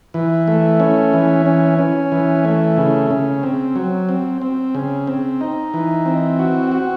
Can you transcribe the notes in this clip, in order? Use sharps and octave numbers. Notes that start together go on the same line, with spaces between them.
E3
A3
C#4
E3
C#4
C#4
E3
A3
C#3
C#3
C4
F#3
C4
C4
C#3
C4
D#4
E3
C4
F#4
F#4